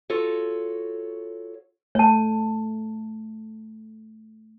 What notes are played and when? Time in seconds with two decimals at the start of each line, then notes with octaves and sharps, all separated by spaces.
0.10 F4 F#4 A4 C#5
1.95 A3 C#5 A5